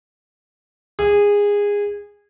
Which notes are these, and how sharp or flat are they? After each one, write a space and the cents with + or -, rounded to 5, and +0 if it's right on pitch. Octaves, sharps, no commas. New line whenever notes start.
G#4 -20